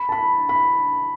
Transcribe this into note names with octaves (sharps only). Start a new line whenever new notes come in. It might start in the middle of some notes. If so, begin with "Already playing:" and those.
Already playing: B5
A5
B5
B5